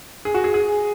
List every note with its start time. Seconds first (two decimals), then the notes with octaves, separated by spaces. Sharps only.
0.25 G#4
0.34 F#4
0.44 G#4
0.54 G#4